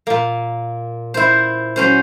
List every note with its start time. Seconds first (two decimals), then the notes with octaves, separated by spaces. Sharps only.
0.07 A#2 A#3
1.14 E4 C5
1.76 F#3 C#4 C5